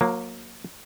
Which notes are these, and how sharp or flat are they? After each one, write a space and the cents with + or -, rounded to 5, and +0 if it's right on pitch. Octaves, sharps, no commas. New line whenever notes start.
F#3 -30 A#3 +0